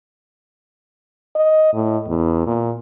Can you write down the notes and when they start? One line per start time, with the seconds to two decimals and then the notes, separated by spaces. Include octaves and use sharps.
1.35 D#5
1.74 A2
2.07 E2
2.47 A#2